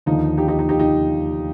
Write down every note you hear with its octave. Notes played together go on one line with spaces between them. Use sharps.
D#2 D3 F3 D#4
D#4 G4
D#4 G4
D#4
D#4 G4
D#4 G4